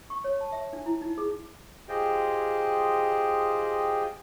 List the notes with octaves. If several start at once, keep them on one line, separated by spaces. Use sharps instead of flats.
C#6
C#5
A5
E5
D4
E4
D#4
G#4
F4 G4 G#4 C5 D#5 G5